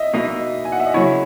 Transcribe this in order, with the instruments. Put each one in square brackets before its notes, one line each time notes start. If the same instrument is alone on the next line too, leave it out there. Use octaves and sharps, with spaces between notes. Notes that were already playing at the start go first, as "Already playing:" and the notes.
Already playing: [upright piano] D#5 E5
[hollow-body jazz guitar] B2 A#3 D#4 [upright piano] D#5
[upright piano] G#5
F#5
E5
D#5
[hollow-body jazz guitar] C#3 F#3 A#3 C#4 E4 [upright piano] C#5